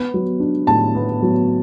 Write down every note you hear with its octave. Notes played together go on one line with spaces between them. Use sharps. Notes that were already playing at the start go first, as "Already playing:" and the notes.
Already playing: B3
F#3
D4
A2 A5
B3
F#3